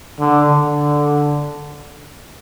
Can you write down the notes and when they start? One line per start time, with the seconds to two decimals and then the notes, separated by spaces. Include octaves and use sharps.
0.19 D3
0.49 D3